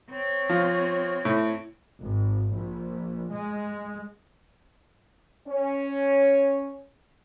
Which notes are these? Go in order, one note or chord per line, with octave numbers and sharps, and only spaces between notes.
C4 C#5
F3
A2
G#1
A#1
G#3
C#4 C#5